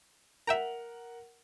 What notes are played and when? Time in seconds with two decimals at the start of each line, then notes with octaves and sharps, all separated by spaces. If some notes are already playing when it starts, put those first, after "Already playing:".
0.47 A#4 E5 F#5 G5 A#5 F7